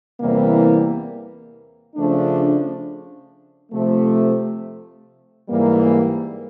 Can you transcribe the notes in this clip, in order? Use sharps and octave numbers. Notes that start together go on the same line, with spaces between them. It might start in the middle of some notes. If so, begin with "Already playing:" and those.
E2 C3 E3 G3 A#3
C#3 F3 A3 D4
C3 F3 A3
G#2 E3 G3 A#3